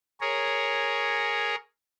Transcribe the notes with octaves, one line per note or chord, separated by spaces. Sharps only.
G#4 A#4 C#5